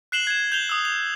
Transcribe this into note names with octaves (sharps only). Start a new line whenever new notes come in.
F#6 C7 E7 F#7 G7
G#6 E7
G6 F7 G7
D#6 E6
F7